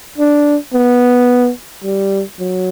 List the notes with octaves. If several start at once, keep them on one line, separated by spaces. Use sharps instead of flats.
D4
B3
G3
F#3